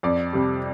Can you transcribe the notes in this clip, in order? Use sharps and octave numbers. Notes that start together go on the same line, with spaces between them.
F2 D5
C3 G3